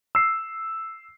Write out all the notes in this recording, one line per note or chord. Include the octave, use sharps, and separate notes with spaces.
E6 C7